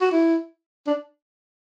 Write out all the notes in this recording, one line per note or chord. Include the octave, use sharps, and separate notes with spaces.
F#4
E4
D4